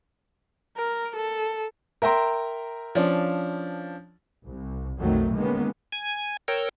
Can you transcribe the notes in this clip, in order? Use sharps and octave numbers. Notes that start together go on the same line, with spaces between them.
A#4
A4
A#4 E5 G5 A#5 C6
F3 C#4 D4
C2
B1 F2 D#3 F#3 A3
D3 D#3 G#3 A#3 B3 C#4
G#5
A#4 C#5 G5 E6